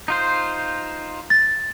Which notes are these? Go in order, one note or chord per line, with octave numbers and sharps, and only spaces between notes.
D#4 F4 C5
A6